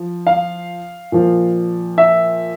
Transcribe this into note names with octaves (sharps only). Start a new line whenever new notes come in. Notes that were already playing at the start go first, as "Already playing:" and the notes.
Already playing: F3
F5
A#2 F3
E5